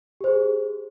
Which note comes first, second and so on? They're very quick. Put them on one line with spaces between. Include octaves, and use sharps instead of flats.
G4 C5 G#4